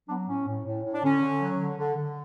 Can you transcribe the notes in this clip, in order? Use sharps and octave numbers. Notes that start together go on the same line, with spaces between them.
F#3 B3 D4
A2 C#4
A2
A2
A2
D4
D3 C#4
D3
F#3
D3
D3
D3